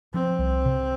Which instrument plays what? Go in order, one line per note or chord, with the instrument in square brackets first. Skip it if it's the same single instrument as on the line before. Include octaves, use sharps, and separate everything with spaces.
[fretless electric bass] F3 [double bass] C4
[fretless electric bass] C2
C3